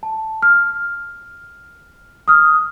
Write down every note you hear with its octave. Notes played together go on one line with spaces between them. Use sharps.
A5
F6
D#6 F6